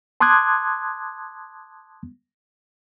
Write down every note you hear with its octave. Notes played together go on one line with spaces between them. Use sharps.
A5 C6 D6 D#6 F#6 G#6